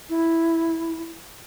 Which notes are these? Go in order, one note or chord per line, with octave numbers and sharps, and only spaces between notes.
E4